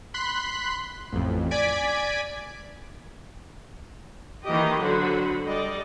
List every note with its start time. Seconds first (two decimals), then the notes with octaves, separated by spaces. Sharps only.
0.14 B5 C6 F#6 B6
1.12 A1 F2
1.51 D5 G#5 G#6 B6 D7
4.45 D#3 E3 A#3 G4 D#5
4.79 D3 F#3 F#4 C5 F#5 B5
5.45 G3 A4 D5 D#5